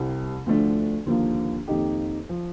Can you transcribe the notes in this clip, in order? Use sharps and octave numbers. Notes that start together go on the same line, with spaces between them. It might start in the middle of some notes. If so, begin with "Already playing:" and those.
Already playing: C2 C3 G3
D2 D3 F3 A3 D4
D#2 D3 F3 A#3
F2 D#3 A#3 D#4 G4
F3